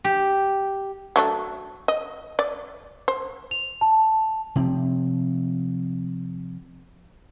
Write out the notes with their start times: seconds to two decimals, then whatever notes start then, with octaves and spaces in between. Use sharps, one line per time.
0.05 G4
1.16 F#3 A3 D4
1.88 D#5
2.39 D5
3.08 C5
3.51 F7
3.81 A5
4.56 C3 F3 C4